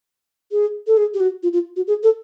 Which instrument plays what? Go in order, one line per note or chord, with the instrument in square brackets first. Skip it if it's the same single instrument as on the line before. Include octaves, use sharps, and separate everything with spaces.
[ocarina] G#4
A4
G#4
G4
F#4
F4
F4
F#4
G#4
A4